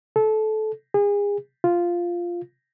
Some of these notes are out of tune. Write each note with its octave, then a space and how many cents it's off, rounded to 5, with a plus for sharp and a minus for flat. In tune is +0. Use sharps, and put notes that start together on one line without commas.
A4 -20
G#4 -35
F4 -5